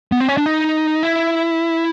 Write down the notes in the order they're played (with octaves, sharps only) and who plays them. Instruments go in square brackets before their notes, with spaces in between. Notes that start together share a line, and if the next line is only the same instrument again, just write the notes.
[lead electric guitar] B3
C4
C#4
D4
D#4
E4